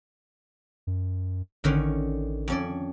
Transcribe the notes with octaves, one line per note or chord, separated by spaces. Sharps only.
F#2
A1 D3 D#3 C#4
F2 C#4 D5